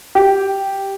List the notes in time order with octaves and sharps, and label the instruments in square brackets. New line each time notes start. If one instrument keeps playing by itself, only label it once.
[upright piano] G4